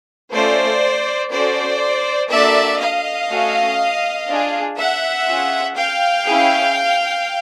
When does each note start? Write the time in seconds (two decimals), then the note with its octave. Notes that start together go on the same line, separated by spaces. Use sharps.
0.33 A3 C#4 F4 C5 D5
1.31 C#4 F#4 A4 C5 D5
2.30 A#3 D4 F#4 A4 D5 E5
2.80 D#5 F5
3.30 A3 C#4 F#4 A4
4.28 D4 F4 G#4
4.77 E5 F#5
5.28 C#4 F4 G#4
5.76 F5 G5
6.26 C#4 E4 G#4